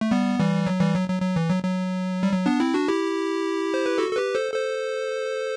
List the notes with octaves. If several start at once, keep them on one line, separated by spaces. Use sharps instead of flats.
A3
G3 B3
E3 G3
F#3
E3 G3
F#3
F#3
F#3
E3
F#3
F#3
G3
F#3
B3 D4
C4 E4
D4 F#4
E4 G4
C5
B4
F#4 A4
A4
G4 B4
A4 C5
A4 C5